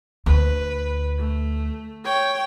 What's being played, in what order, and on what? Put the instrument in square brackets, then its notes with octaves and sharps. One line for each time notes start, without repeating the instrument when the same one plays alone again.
[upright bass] D2 [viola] B4
[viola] A3
C#5 G5